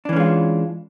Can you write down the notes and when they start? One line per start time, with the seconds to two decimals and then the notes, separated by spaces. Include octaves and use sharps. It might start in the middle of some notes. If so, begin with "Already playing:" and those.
0.05 D4
0.09 E3
0.13 C#4
0.16 G#3
0.20 F4